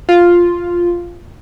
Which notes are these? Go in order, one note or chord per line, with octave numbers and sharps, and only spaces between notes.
F4